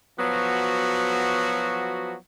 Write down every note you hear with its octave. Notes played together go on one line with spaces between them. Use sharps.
F3 F#3 B3 F#4